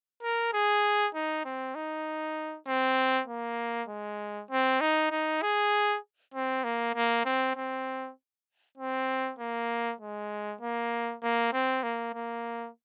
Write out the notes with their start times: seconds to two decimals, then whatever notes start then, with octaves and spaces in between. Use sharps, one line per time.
0.23 A#4
0.53 G#4
1.15 D#4
1.45 C4
1.75 D#4
2.67 C4
3.28 A#3
3.89 G#3
4.50 C4
4.81 D#4
5.11 D#4
5.42 G#4
6.34 C4
6.64 A#3
6.95 A#3
7.25 C4
7.56 C4
8.78 C4
9.39 A#3
10.01 G#3
10.61 A#3
11.22 A#3
11.53 C4
11.83 A#3
12.14 A#3